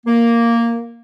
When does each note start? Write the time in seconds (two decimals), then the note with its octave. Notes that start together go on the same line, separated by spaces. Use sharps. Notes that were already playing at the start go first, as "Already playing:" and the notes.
0.06 A#3